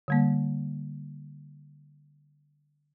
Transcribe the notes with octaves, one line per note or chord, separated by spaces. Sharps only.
D3 G3 A#3